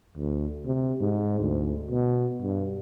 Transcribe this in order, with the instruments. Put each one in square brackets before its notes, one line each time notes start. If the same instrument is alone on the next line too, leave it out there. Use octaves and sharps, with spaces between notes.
[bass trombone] D2
C3
G#2
D2
B2
G2